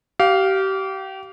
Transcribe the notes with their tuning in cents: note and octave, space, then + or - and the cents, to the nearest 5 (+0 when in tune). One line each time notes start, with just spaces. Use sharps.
G4 -30 F5 +0